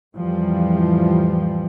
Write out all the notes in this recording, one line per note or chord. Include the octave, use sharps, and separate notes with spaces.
F2 A2 E3 F3 G3